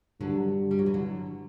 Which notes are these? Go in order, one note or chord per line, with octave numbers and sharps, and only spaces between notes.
G2 D3 F#3
G3
F#3
E3
D3 F#3